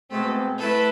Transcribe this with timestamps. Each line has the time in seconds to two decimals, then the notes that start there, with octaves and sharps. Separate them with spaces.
0.11 B2 G#3 A3 C4 A4
0.59 A3 E4 A4 B4